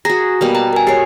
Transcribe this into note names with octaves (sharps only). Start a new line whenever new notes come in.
F#4 G#4 A#5 A#6
B2 G3 A#3
A5 A#5
A#4 G#5
G#3 G4 C#5 G#5 C7